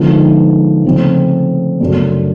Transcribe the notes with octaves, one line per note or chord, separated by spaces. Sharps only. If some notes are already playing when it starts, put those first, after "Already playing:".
Already playing: D3 F3 G#3 B3 D#4
C#3 F3 A3 C4
F#2 C#3 F#3 A3 D4